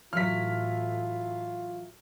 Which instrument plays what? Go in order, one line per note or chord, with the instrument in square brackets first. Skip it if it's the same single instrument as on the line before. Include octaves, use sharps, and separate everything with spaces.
[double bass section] A2 [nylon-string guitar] E3 F#3 [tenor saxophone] F4 [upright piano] F6 B6